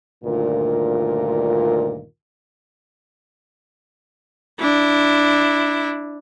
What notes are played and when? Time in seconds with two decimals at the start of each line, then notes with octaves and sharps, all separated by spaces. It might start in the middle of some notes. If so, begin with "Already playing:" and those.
0.24 D2 G2 A#2 D#3 F4 A#4
4.60 D4 E4